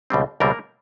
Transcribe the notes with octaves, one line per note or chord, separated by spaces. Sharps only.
C#2 B2 G3 C4
C#2 B2 G3 A#3 C4 A#4